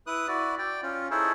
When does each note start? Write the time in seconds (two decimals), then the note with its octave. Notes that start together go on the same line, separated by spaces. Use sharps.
0.07 E4 B4 D#6 F#6
0.28 E4 F#4 D5
0.59 D5 G5
0.83 C#4 F4
1.11 D#4 E4 G#4 A4 C5 C#5